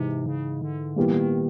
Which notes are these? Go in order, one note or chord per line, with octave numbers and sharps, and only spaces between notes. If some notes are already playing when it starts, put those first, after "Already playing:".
Already playing: G#2 C3 E3 G#3
C#3
D3
A#2 D#3 G3 B3 E4
E3
D#3